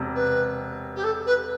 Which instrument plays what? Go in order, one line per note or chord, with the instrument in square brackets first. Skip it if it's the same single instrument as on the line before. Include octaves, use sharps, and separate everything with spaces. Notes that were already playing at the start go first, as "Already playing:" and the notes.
Already playing: [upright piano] E1 C3
[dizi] B4
G4
A4
B4